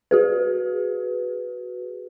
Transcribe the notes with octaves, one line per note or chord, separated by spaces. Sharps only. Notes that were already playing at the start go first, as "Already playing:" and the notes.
F#4 G#4 B4